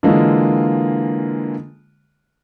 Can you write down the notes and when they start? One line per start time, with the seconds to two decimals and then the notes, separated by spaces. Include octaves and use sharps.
0.03 D3 E3 G#3 A#3 F4